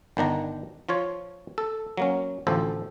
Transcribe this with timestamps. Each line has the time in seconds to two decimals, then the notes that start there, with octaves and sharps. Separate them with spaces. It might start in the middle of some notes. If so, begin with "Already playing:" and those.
0.17 G1 D#3 D4 A#5
0.89 F3 F4 C#5
1.58 A4
1.97 F#3 A#3 C#4
2.47 A1 D2 F3 A4 C5